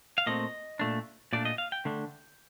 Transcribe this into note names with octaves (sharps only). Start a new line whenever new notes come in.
F5
A#2 A3 C4 D#5
A#2 A3 D4
A#2 A3 D4 D5
D#5
F5
G5
D3 A3 D4